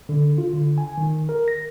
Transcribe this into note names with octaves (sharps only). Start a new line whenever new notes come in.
D3
F4
D3
G#5
D#3
A#4
A#6